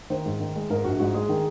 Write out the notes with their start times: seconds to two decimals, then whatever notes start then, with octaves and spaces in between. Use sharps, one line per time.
0.10 D#3 C5
0.25 G#2
0.40 D#3
0.56 G#3
0.70 G#2 A#4
0.84 A#1 F#4
0.99 G#2 F#4
1.14 G#3 G#4
1.29 D#3